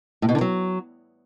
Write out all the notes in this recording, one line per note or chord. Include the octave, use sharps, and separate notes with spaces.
A2
B2
D3
F#3